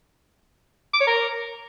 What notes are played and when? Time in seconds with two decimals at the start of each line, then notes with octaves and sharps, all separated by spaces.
0.94 D6
1.00 C#5
1.07 A#4